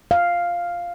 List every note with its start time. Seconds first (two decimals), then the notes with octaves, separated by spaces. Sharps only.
0.11 F5